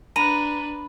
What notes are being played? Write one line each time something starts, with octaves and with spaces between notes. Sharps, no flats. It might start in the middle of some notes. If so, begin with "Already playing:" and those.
D4 B4 A#5 B5 D#7